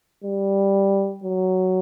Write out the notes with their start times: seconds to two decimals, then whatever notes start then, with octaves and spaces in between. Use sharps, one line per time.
0.24 G3
1.24 F#3